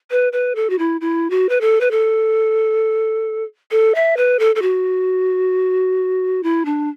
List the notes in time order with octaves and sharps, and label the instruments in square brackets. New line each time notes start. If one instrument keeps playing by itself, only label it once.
[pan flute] B4
B4
A4
F#4
E4
E4
F#4
B4
A4
B4
A4
A4
E5
B4
A4
A4
F#4
E4
D4